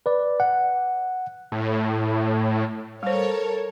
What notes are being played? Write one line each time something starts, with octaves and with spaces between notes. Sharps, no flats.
B4 D5
F#5
A2
G3 A4 A#4 C5 C#5